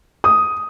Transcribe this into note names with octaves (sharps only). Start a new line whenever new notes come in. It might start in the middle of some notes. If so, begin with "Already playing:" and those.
D#6